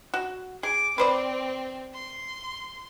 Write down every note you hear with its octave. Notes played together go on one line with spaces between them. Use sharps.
F#4
G#4 D6
C4 B4 C5 D5
C6